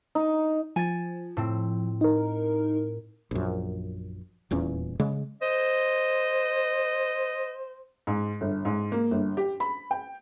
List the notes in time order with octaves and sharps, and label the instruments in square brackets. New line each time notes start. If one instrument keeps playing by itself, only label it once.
[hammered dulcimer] D#4
[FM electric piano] F3 [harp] G#5 A6
[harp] A2 C4
[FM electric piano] D#4 A#4
[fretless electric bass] A#1 F#2
D#1 E2 A#2 C#4
C#3 G#3
[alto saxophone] C5 [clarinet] D#5
[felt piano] G#2
G1
G#2
A#3
G1
G4
B5
G5